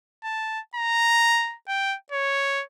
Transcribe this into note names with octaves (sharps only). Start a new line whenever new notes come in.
A5
A#5
G5
C#5